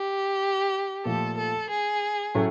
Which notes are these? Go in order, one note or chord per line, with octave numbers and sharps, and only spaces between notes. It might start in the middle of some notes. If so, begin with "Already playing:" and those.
Already playing: G4
A#2 F3 A3 A4
A4
G#4
A2 F#3 A3 C#4